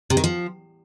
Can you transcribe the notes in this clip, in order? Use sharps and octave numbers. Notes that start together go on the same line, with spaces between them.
C3
D#3
F3